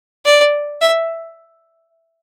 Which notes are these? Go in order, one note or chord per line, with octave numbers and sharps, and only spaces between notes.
D5
E5